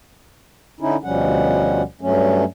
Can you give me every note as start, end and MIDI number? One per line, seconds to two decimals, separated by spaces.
0.81 0.96 50
0.81 0.96 61
0.81 0.96 63
0.81 0.96 64
1.04 1.82 38
1.04 1.82 47
1.04 1.82 53
1.04 1.82 55
1.04 1.82 61
1.04 1.82 78
2.01 2.44 43
2.01 2.44 54
2.01 2.44 57
2.01 2.44 61